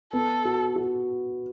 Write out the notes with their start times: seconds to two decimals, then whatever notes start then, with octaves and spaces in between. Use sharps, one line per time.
0.13 B3 A4
0.45 F#4
0.76 F#4